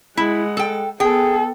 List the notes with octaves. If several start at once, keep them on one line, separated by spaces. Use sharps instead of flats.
G#3 E4 F#5
A4 G5
B3 G#4 A4 G5